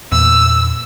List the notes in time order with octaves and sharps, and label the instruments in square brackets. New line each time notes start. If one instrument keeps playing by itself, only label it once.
[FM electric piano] E2 A#2 [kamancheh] E6